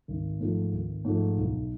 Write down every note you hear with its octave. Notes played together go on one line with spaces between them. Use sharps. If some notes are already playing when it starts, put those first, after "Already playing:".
G#1
G#2 F3 A3
G#1
G#2 F3 A3
B1